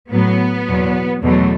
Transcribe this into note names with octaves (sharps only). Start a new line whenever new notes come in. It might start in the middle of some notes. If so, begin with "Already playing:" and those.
A2 F#3 B3
E2 B2 F#3
E2 B2 F#3 A3